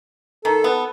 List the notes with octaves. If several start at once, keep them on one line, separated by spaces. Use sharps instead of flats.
D#3 A4
B3